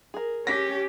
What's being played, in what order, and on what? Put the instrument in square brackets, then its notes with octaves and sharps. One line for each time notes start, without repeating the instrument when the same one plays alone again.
[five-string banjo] G#4 A#4
[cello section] C#4 G4 [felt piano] A#6 B6